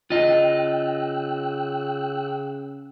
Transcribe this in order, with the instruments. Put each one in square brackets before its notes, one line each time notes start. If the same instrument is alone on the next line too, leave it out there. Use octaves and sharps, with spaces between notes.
[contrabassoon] C#3 [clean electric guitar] F4 D#5 [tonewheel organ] G5 E6 F#6